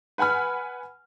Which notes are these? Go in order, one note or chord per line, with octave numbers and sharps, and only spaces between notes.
B4 F#5 G#5 B5 F6